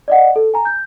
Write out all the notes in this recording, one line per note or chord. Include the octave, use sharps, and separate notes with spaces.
D5 D#5 F#5
A4
G#5 A#5
G6